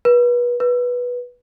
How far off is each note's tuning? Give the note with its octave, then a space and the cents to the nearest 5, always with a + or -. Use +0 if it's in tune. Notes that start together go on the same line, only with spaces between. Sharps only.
B4 -30
B4 -10